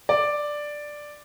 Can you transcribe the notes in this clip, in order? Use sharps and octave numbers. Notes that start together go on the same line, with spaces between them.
D5